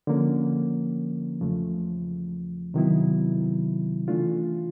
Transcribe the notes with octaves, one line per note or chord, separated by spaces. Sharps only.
D3 F3 A#3 C#4
E2 C#3 F3 A3
C3 D#3 F#3 B3 E4
C#3 E3 A3 D4 F4